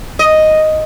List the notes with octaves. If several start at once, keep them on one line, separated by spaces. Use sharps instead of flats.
D#5